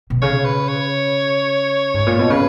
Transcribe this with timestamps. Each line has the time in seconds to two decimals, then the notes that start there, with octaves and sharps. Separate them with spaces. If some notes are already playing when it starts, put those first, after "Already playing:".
0.10 B2
0.22 C#3 C#5
0.45 B4
0.69 C#5
1.94 G#2
2.07 A#2
2.19 B2
2.30 C#3 B4